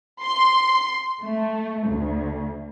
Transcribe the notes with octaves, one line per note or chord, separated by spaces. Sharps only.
C6
A3
D2